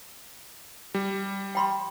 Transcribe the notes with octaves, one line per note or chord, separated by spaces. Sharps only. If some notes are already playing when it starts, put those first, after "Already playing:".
G3
G5 B5 C6